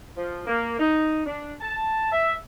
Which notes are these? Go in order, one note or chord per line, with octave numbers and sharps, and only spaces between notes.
F3
A#3
D#4
D4
A5
E5